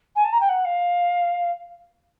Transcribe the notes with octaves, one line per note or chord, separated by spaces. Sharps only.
G#5
A5
A#5
G5
F#5
F5